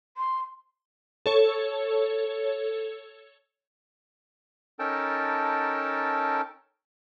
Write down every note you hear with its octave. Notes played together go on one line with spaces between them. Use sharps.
C6
A4 C#5
C#4 D#4 A4 A#4 G5 A5